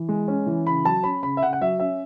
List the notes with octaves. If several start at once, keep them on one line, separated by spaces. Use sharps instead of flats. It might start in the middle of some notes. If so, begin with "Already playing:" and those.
Already playing: E3
G#3
C#4
E3
C#3 B5
F#3 A5
C#4 B5
C#3 B5
E5
C#3 F#5
F#5
F#3 E5
C#4 E5